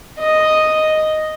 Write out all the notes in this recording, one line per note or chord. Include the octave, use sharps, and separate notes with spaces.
D#5